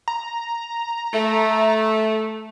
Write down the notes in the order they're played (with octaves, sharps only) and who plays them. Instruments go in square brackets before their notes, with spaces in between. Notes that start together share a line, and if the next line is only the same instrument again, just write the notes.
[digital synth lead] A#5
[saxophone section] A3